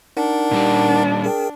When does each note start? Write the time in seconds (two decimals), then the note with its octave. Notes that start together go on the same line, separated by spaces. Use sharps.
0.17 D4 D#4 A#4 F#5
0.51 A#2 G3 G4
1.24 G#4 A#4 G5